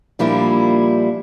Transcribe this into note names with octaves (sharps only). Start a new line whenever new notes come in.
A#2 F3 G3 A#3 D4 E4